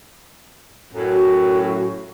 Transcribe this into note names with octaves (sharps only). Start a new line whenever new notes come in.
F#2 A2
F#4